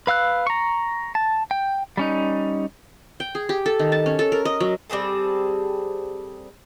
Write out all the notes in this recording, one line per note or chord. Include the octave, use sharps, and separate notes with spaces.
B4 F5 E6 F#6
A#5 C#6
A5
G5
G3 C#4 D#4
G5
G#4
G4
A4
D#3
A5
C#4
A4
A#4
D#5
F#3
G3 C4 G#4 A4